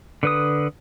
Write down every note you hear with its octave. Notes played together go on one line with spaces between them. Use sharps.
D3 B4 D#6